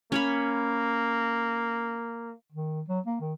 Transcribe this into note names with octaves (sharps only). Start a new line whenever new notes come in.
A#3 C#4 C#5 B5
D#3
F#3
A#3
D#3